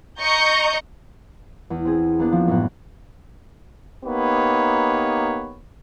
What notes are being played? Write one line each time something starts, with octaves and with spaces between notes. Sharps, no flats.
D#5 A#5 C#6 G6
E2
C4 G#4
A#3 B3 D4
F3
F#2 A2 B3
A#3 B3 D#4 G4 B4 C#5